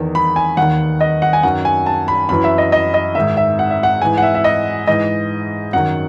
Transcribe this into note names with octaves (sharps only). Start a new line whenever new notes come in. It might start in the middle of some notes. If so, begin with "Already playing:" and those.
Already playing: E2 D#3
B5
G#5
D#2 D#3 F#5
D#5
F#5
G#5
F#2 D#3 F#5
G#5
A5
B5
F#2 E3 B5
E5
D#5
D#5
D#5
G#2 D#3 E5
E5
F#5
E5
F#5
G#2 E3 G#5
F#5
E5
E5
D#5
G#2 E3 D#5
F#2 D#3 F#5